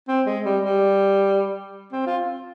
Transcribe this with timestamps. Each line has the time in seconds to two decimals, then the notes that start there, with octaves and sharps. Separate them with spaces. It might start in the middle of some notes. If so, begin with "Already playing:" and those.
0.08 C4
0.27 G#3
0.45 G3
0.65 G3
1.92 C4
2.07 F4